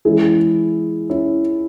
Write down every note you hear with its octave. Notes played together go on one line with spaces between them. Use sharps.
E3 G#3 C#4 E4 G#4
C#4 E4